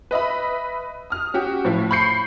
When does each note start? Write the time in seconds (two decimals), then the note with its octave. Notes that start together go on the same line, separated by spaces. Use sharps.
0.11 B4 D#5 E5 B5
1.10 D#6 F6
1.34 C#4 F#4 G4
1.65 A2 F3 E4
1.91 B5 C#6 G6 C7 C#7